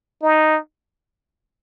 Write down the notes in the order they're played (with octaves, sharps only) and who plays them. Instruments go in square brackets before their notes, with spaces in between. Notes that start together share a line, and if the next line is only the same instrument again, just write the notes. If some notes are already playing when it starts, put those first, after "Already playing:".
[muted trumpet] D#4